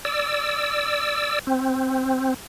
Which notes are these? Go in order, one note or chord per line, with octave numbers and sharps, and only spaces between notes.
D5 E6
C4